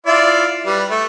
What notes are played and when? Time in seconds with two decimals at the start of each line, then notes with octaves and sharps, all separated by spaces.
0.06 E4 F4 D5
0.66 G3 B4
0.90 A3